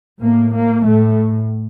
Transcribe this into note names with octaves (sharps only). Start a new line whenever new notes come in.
A2 A#3
A#3
A2 A3